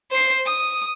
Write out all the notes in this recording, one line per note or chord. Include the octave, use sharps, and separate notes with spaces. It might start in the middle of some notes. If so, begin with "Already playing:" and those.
C5 C7
D#6